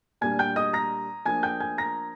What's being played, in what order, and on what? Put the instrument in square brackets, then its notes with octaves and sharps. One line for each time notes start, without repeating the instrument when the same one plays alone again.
[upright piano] A#2 G3 D4 G#5 G#6
G5 G6
D#5 D#6
A#5 A#6
F3 A#3 D4 G#5 G#6
G5 G6
G#5 G#6
A#5 A#6